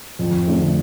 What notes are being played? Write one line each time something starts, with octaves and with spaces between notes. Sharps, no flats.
F2
D3 A3